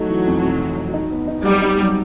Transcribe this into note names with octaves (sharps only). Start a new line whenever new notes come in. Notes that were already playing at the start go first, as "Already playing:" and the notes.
Already playing: F#3 A3 D#4
E3
F2
C3
E3
F2
D#4
B3
D#4
F#3 G3
D#4
F#3